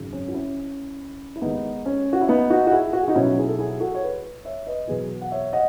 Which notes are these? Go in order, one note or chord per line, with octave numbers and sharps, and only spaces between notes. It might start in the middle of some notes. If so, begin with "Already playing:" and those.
Already playing: G#1 F#2 C#3
C#4
F#4
C#4 E4
E4
D#2 D#3 G#3 B3 D#4
C#4
F#4
E4
B3 D#4
D#4 F#4
F#4
E4 G#4
F#4
G#4
D#4 F#4
B1 B2 F#3 C#4 E4
E4 G#4
A4
E4 G#4
F#4 A4
C#5
G#4 B4
C#5 E5
B4 D#5
E2 B2 F#3 G#4 B4
F#5
C#5 E5
D#5 F#5